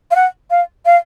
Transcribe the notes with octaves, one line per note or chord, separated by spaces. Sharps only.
F5
F#5
F5
F5